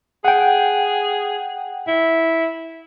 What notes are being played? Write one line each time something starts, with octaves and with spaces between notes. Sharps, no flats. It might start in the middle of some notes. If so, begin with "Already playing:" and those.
G#4 F#5 G5
E4